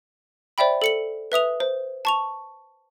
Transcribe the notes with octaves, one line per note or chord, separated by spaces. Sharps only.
C5 D5 E5 G5 B5
A4 C#7 F#7
B4 E5 D#6 F7
C5
A5 C#6 F7